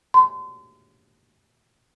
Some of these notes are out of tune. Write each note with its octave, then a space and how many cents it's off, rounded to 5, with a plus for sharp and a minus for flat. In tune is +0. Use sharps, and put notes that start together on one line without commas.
C6 -35